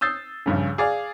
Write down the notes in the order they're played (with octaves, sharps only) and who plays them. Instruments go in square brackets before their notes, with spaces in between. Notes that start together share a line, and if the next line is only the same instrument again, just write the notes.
[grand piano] D#6 E6 G6 A6 C7
A#1 G2 C#3
G#4 D5 F5